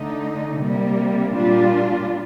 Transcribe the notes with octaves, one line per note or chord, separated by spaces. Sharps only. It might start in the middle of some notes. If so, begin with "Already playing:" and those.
Already playing: D3 A3 D#4
C3 G3 A#3
A#2 G3 D4 F4